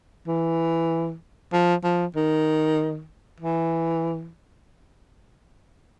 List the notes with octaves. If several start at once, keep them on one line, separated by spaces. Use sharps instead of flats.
E3
F3
F3
D#3
E3